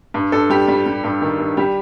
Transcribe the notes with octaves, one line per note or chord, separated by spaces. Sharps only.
G2
G2 A4
G3 G4
G3
G3
G2
D#3
G2
G3 G4